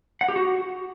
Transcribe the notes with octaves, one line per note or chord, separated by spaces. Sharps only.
F#5
G4
F#4